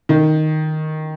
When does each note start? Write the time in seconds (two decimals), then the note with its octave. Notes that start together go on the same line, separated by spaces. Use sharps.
0.09 D#3